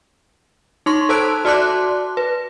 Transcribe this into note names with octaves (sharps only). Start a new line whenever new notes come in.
D#4 C6 C#6
A4 C5 A5 E6 F#6 D7
F#4 D5 A5 C6 D6 F#6
B4